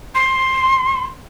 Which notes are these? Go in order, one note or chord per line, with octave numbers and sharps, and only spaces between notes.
C6